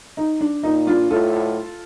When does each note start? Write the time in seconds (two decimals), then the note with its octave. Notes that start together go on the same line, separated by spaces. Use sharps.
0.17 D#4
0.41 D4
0.63 A#2 D#4
0.87 D4 F4
1.10 A2 F4 A4